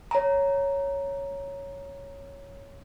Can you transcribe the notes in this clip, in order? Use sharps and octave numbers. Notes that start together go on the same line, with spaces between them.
C#5 A#5